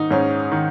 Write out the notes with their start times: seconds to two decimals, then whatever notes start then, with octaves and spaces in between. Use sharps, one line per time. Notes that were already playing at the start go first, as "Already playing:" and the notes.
Already playing: G#2 D#3 D#4
0.11 G#2 C#4
0.52 D#3